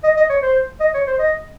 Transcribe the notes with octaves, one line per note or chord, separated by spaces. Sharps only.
D#5
D#5
C#5
C5
D#5
C#5
C5
D#5